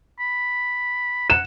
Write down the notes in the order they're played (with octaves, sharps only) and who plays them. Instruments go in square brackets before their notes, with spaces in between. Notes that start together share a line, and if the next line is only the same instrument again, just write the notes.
[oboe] B5
[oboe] F#5 [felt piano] E7